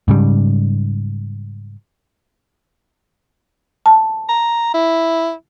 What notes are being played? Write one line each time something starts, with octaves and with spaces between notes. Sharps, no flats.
G#2 C#3 G3
A5
A#5
E4